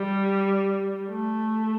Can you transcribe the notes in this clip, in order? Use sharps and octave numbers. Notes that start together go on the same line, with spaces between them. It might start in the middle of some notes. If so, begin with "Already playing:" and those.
Already playing: G3
A3